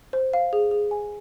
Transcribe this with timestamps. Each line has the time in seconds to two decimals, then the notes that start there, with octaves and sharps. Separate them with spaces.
0.13 C5
0.33 F5
0.53 G#4
0.71 G#4
0.91 G#5